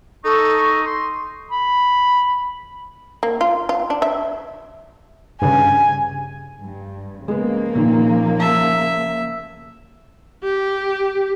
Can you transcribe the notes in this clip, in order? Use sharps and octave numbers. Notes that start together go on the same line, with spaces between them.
D#4 A4 C#6
C6
B5
A#3
F4
F4
D4
E5
G2 C#3 G#5
G2
C#3 F3 G#3 A#3 B3
A#2 D#3
E5 A5
G4